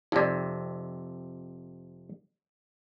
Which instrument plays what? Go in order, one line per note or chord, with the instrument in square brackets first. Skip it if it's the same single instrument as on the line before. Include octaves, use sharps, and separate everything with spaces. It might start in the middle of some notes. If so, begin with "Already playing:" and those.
[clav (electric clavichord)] F2 C3 [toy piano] D#4 D5